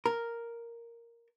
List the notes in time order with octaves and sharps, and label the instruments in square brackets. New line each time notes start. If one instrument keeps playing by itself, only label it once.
[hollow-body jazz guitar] A#4